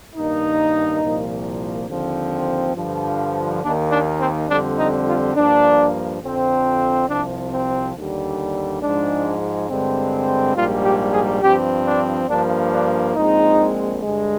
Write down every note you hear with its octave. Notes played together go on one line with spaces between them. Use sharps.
G2 D#3 A#3 D#4
C2 A#2 F3 A#3
D#2 D3 F3 C4
G2 D3 F3
D#2 D#3 A#3 D4
D4
C4
F2 D3 G3 C4 D4
D#4
F4
G2 F3 A#3 D4
F2 D3 F3 C4
C2 C3 F3 D4
C4
D#2 D3 G3
G#2 F3 G#3 D4
G2 D3 G#3 C4
A#1 G#2 G3 A#3 F4
G4
G#4
G2 F3 C4 G4
D4
G2 F3 A#3 D4
D4
A#1 A#2 G#3 C4 D#4
G2 D3 G#3